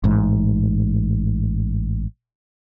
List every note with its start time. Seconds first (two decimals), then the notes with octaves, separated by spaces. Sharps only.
0.04 A1 G#2